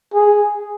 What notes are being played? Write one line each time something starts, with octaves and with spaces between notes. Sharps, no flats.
G#4